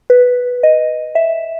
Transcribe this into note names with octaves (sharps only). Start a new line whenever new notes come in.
B4
D#5
E5